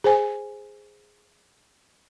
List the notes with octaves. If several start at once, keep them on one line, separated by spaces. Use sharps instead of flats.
G#4 C5 G#5